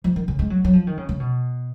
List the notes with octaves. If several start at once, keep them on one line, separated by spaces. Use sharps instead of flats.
F3
D#3
C#3
G#3
F#3
F#3
F3
D#3
C#3
C#3
B2